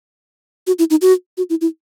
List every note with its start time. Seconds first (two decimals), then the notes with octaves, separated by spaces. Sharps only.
0.67 F#4
0.79 E4
0.90 D#4
1.02 F#4
1.37 F#4
1.50 E4
1.61 E4